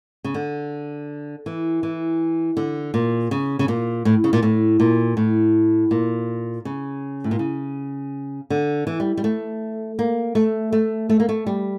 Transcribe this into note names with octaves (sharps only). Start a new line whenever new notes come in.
C#3
D3
E3
E3
D3
A#2
C#3
C#3
A#2
A2
C#3
A#2
A2
A#2
A2
A#2
C#3
A2
A#2
C#3
D3
E3
G3
G3
A3
A#3
A3
A3
A3
A#3
A3
G3